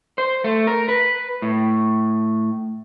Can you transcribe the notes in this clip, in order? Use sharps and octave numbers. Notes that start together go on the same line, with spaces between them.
C5
A3
A#4
B4
A2